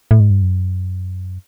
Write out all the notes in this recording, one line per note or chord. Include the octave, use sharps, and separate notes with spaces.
A2
G#2
G2
F#2